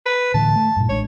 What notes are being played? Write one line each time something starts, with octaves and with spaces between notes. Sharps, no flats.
B4
A2 D3 E3 A5
A3
G2 A#2
A1 G#3 D4 C#5